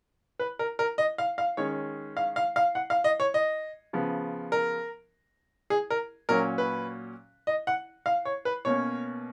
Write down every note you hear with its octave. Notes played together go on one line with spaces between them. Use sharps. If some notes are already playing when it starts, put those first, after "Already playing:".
B4
A#4
A#4
D#5
F5
F5
D#3 G#3 C#4 C#5
F5
F5
F5
F#5
F5
D#5
C#5
D#5
C#3 F3 B3
A#4
G#4
A#4
A#2 F#3 C#4 A#4
B4
D#5
F#5
F5
C#5
B4
B2 A#3 C#4 C#5